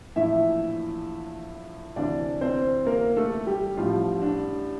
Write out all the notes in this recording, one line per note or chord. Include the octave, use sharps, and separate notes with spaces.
A#1 A2 E3 E4 E5
D2 C3 E3 D4 D5
C4 C5
A#3 A#4
A3 A4
G3 G4
A1 A2 F3 G3 F4
D4